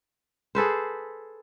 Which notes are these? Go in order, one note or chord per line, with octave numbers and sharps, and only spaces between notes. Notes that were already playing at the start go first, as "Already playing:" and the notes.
G#4 A4 B4 C5